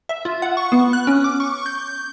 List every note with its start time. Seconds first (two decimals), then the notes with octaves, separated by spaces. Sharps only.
0.09 E5
0.25 F4
0.42 F#5
0.57 C#6
0.72 B3
0.93 F#6
1.07 C#4
1.24 D6
1.40 C#6
1.66 G6